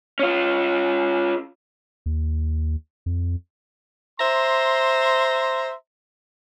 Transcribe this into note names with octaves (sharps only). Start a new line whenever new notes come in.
C#4 F4
D#2
F2
C5 E5 A#5 C6